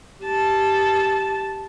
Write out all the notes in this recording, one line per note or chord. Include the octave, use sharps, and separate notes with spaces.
G4 A5